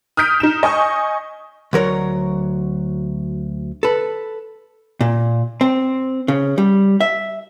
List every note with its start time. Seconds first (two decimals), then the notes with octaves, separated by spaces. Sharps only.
0.17 D#6 F6 G6 B6 D7
0.40 D#4 E7
0.63 D#5 G#5 C#6 D#6
1.73 D2 F#3 A#4 C#5
3.83 A4 B4
5.01 A#2
5.61 C4
6.28 C#3
6.58 G3
7.01 E5